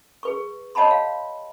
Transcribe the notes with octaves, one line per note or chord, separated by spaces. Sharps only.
G#4 B4 C#6
C#5 D#5 F#5 A5 B5 C6
F5